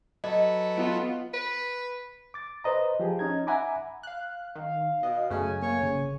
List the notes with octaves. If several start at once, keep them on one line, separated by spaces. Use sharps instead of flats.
F#3 A4 B4 D#5
B3 F4
B4
D6 A6
B4 C5 D#5 A#5
F3 G4 G#4
C#4 D#4 A#5 G#6
E5 F#5 G#5 A#5 B5 D6
F5 F#6
D#3 F5
B2 D#5
F#2 C#3 A3 G#5
A#3 C#5
G#1 C#3